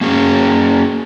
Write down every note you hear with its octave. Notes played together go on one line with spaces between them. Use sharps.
A#3 C#4 G#4